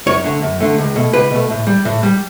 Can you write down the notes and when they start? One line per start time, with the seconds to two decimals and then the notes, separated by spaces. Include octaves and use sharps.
0.06 F#2 C#5
0.24 D3 A3
0.42 F#2
0.60 D3 A3
0.78 C#2
0.96 B2 A3
1.13 C#2 B4
1.31 B2 A3
1.50 A2
1.67 G3
1.85 A2
2.03 G3